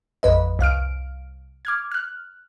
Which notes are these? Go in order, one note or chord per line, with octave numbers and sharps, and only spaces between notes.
A1 F2 B4 D#5
C2 F5 F6 D7
D6 F6 G#6
F6 F#6